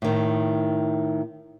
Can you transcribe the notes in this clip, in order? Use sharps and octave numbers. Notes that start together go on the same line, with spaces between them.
A2 D#3